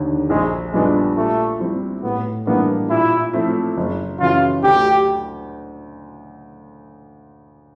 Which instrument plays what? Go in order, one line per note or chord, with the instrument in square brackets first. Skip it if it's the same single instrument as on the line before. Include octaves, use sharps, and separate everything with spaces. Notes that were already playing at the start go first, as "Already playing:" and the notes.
Already playing: [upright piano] F1 D#2 D3
[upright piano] A#1 [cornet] G#3
[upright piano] A#2 G3 B3 D4 [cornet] G#3
[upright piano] A#2 [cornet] A3
[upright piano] G3 C4 E4
[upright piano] A2 [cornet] B3
[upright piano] E3 G3 A#3 D4 [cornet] B3
[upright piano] A#2 [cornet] E4
[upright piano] F3 A3 C4 E4
F#1
[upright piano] F#2 C#3 E3 [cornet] F4
[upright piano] D2 [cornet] G4